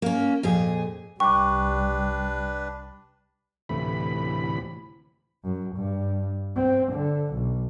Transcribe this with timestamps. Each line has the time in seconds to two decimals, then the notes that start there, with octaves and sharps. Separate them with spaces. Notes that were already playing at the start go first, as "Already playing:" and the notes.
0.02 A#3 C#4
0.43 F2 A#2 G#4
1.20 C2 G3 D4 B4 G5 C#6 D6
3.69 D2 A2 C3 E3 B5
5.44 F#2
5.76 G2
6.56 C4
6.93 D3
7.34 B1